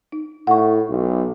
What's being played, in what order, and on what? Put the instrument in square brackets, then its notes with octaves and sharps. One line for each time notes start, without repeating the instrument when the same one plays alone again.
[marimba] D#4
[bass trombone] A2 [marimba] F#5 C#6
[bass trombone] B1